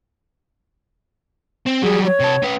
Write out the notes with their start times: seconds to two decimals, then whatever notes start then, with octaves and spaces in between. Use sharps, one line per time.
1.66 C4
1.83 F#3 G3 G#4
2.06 C#5
2.20 C3 A5
2.43 C#4 B4